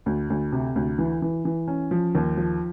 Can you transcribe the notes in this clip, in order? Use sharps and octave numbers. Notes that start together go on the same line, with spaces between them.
D2
D2
C3
D2
E3
E3
E3
C#4
F3
D#2
F3